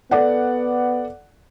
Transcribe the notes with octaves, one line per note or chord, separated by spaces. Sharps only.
B3 A4 D5 F#5